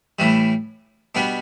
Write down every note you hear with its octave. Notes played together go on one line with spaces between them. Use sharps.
A2 E3 G3
B2 G3 B3 D4